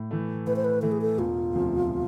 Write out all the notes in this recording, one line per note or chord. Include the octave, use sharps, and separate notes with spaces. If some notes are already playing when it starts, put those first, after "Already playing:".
Already playing: A2
E3 A3
A2 B4
C5
B4
E3 A3 A4
G#4
A4
E1 F4
D2 C3 F3